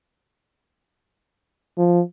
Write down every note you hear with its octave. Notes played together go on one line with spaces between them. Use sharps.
F3